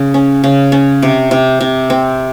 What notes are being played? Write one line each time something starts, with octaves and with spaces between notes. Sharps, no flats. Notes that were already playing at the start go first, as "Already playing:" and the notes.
Already playing: C#3
C#4
C#3
C#4
C3
C3
C3
C4